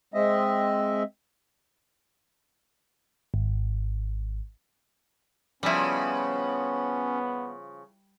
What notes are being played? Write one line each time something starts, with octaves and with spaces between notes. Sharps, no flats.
G#3 C4 D#5 E5
G#1
C#3 F3 G3 B3 C#4 E4